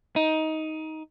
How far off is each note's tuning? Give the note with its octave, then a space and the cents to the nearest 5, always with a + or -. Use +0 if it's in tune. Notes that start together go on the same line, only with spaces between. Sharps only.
D#4 +15